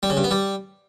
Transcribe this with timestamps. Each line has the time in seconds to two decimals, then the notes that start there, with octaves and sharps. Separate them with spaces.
0.03 G3
0.10 C#3
0.17 G2
0.24 B3
0.31 G3